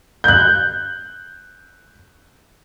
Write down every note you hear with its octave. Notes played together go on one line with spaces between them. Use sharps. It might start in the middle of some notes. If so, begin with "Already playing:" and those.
F#6 G6